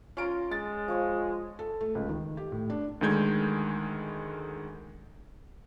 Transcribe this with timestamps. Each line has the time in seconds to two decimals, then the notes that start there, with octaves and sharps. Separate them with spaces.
0.17 C#4 F4 A#5 C6 D7
0.51 G#3 A6
0.88 F3 C#5 D#6
1.59 A4
1.81 A3
1.95 C#2
2.09 D#3
2.37 G4
2.52 A2
2.70 D4
3.01 D2 D3 D#3 G#3 G6 G#6